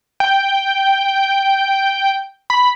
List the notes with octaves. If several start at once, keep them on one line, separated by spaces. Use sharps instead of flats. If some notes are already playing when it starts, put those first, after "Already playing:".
G5
B5